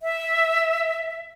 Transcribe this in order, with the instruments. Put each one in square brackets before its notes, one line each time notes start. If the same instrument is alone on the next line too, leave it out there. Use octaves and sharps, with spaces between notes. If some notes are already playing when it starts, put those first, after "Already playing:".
[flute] E5